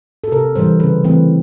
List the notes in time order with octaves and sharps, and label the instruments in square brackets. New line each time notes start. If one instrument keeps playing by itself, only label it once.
[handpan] A4
C3 A#4
E3 G3 C5
C#3 B4
E3 A3 C4